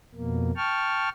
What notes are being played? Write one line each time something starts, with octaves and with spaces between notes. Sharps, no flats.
F2 B2 A#3
G5 A5 C#6 F6